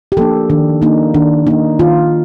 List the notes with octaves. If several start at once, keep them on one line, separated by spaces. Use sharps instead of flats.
G4
F3 A#3 D4 A4
D#3 D4
A#3 D4 D#4
D#3 D4
A#3 D4 D#4
D#3 F4